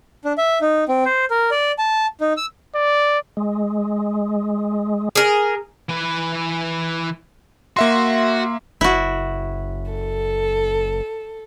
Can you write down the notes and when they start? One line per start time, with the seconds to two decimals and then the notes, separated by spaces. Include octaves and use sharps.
0.25 D4
0.38 E5
0.61 D#4
0.88 C4
1.05 C5
1.30 A#4
1.51 D5
1.79 A5
2.21 D#4
2.37 E6
2.75 D5
3.37 G#3
5.15 G#4 A#4
5.89 E3 B4
7.77 A#3 F#4 E5 C6
8.81 F#1 E4 F#4
9.90 A4